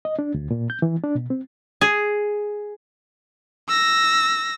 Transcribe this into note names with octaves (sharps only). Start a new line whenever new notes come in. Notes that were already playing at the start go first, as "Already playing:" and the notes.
D#5
D4
D2
A#2
G6
E3
D4
B2
C4
G#4
E6 A#6